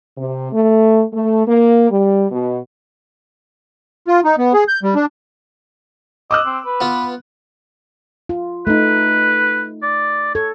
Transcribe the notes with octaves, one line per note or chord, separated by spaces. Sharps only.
C3
A3
A3
A#3
G3
B2
F4
D#4
B3
G#4
G6
G3
D4
D#5 D6 E6 F#6
C4
B4
B3 F4
F4
A3 D#4 B4
D5
A4 C#5